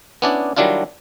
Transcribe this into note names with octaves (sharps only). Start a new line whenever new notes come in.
B3 C#4 D4 E4 D5
D#3 F#3 G3 D4 E4 F4